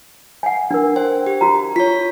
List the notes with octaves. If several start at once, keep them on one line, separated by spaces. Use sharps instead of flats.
F#5 G#5
D4 A#4
C5 G5
G4
F#4 A#5
F4 C#5 B6